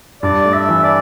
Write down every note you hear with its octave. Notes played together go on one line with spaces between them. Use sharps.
G2 D5
A3
E5
E3
D5